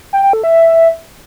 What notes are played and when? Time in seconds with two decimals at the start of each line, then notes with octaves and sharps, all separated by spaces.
0.13 G5
0.23 G5
0.33 A4
0.44 E5